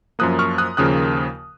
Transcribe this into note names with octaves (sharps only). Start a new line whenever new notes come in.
F#2 F3 A#3 D#6 F#6
C#6 F6
D#6 F#6
D#2 C#3 F3 A#3 D#6 F#6